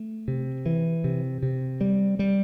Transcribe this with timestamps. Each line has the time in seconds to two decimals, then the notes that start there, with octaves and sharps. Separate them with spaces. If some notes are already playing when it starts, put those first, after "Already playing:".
Already playing: A3
0.28 C3
0.66 E3
1.04 C3
1.43 C3
1.81 G3
2.19 G3